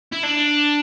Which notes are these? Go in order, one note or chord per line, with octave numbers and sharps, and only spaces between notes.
E4
D4